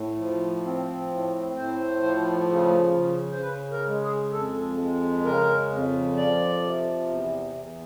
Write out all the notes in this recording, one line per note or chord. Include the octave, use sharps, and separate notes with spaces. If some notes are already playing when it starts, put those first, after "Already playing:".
Already playing: A2
F3
C4
A2
A2 C5
F3
C#3
C#3
C5
C#3 B4
A#4
G#3
G#4
F2 A4
G#3
C#3 A#4
F2
F3 D5
C3
E2
E2